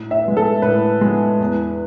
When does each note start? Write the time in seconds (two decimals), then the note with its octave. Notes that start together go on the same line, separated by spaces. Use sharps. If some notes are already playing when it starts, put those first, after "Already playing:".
Already playing: A2
0.11 E5
0.24 G#3 B3
0.37 A4
0.62 A2 B4
1.01 G#3 B3
1.40 E2